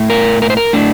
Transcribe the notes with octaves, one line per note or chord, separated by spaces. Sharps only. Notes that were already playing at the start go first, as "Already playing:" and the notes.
Already playing: A2
A#4
A#4
C5
A#4
A2 D4